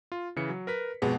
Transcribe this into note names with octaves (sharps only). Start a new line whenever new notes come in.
F4
C#3 E3 C#7
F#3
A#4 B4 B6
F2 B2 G#3 B3